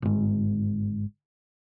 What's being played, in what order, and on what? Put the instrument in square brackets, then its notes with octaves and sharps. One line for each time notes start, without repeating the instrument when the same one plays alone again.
[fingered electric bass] G1 G#2